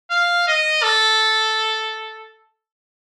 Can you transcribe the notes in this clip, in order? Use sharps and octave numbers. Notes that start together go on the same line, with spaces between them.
F5
D#5
A4